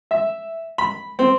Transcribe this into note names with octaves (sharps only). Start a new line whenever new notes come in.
E5
B5
C4